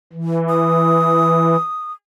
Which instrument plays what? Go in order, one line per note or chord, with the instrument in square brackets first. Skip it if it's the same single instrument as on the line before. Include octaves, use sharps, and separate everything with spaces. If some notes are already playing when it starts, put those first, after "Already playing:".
[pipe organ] E3
[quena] D#6